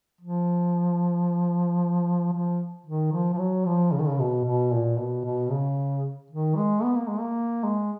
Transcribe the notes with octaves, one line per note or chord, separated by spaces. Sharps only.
F3
F3
D#3
F3
F3
F#3
F3
C#3
D#3
C#3
B2
B2
A#2
B2
B2
C#3
D#3
G#3
B3
A#3
G#3
A#3
G#3